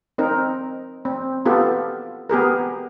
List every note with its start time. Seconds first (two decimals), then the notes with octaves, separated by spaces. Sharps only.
0.18 C4 D#4 A#4
1.05 C4
1.46 B3 F4 G4 A4
2.29 B3 G4 G#4 A#4